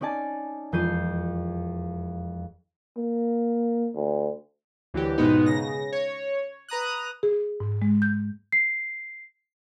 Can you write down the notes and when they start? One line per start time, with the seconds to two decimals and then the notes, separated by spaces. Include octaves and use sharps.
0.01 C#4 D#4 D5 G#5 A5
0.72 E1 F2 F5 G6 C7 D#7
2.97 A#3
3.95 D2
4.94 D2 E3 F#3 G4
5.18 G#2 B2 G#3 B3 D#4
5.46 C#3 A#6
5.92 C#5
6.69 B4 A#5 D#6 F#6
7.23 G#4
7.60 G#2
7.82 G#3
8.02 G6
8.52 C7